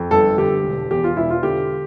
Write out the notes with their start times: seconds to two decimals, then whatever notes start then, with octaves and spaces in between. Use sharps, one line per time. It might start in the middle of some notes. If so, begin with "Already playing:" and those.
Already playing: F2
0.11 G1 A4
0.38 D3 G4
0.64 E1
0.91 E2 G4
1.04 F4
1.17 E1 E4
1.30 F4
1.43 D3 G4